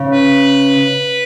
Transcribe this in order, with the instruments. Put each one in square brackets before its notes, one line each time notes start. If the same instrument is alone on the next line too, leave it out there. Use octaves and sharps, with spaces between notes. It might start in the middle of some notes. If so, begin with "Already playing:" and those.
Already playing: [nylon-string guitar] C#3
[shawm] B4